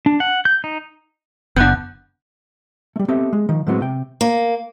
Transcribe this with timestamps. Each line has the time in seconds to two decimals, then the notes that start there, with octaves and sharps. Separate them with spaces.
0.06 D4
0.20 F#5
0.45 G6
0.64 D#4
1.56 F#1 B3 D4 F#5 F#6 G6
2.96 G3 A3
3.08 B3 C4 G4 A4 D#5 E5
3.33 G#3
3.49 D#3 F3
3.67 A2 F#3 G#3 B3 C4 F#4
3.81 C3 G5
4.21 A#3